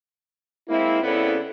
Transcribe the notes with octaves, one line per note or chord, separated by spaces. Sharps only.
G#3 A#3 C4 E4
C#3 B3 C4 E4 A4 D5